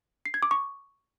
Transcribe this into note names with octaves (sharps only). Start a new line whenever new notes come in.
C7
G#6
D6
C#6